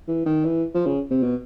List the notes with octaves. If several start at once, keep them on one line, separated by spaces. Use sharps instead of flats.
E3
D#3
E3
F3
C#3
C3
B2